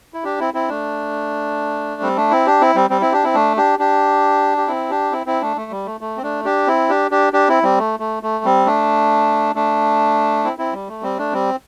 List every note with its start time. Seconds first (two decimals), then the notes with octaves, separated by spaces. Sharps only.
0.14 E4
0.24 D4 G4
0.40 C4 E4
0.54 C4 E4
0.69 A3 D4
2.02 G3 C4
2.16 A3 D4
2.31 C4 E4
2.46 D4 G4
2.61 C4 E4
2.75 G3 C4
2.90 G3 C4
3.02 C4 E4
3.12 D4 G4
3.24 C4 E4
3.34 A3 D4
3.57 D4 G4
3.79 D4 G4
4.57 G4
4.67 C4 E4
4.90 D4 G4
5.12 C4 E4
5.26 C4 E4
5.42 A3 D4
5.57 A3
5.71 G3
5.86 A3
6.01 A3
6.17 C4
6.23 A3 D4
6.44 D4 G4
6.67 C4 E4
6.89 D4 G4
7.11 D4 G4
7.33 D4 G4
7.49 C4 E4
7.63 G3 C4
7.78 A3
8.00 A3
8.23 A3
8.44 G3 C4
8.66 A3 D4
9.55 A3 D4
10.44 C4 E4
10.58 C4 E4
10.73 G3
10.88 A3
11.02 G3 C4
11.18 A3 D4
11.33 G3 C4